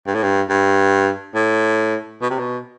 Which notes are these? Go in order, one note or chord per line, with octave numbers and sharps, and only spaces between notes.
G2
A2
G2
G2
A2
B2
C3
B2